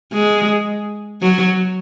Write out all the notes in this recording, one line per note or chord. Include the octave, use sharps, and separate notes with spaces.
G#3
F#3